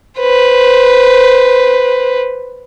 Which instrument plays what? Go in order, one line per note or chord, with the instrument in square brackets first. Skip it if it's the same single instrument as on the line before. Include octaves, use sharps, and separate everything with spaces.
[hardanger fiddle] B4 C5